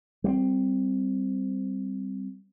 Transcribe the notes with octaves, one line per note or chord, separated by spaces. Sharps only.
G3 A#3 C4